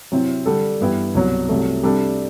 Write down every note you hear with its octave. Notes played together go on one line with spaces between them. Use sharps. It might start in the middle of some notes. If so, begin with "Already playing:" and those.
C3 F#3 C4 E4
D3 G3 D4 A4
G2 E3 B3 E4 G4
C2 B2 F#3
C2 C3 F#3 A3
C3 G3 D4 A4